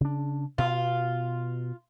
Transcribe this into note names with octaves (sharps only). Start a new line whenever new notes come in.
C#3 D4
B2 F4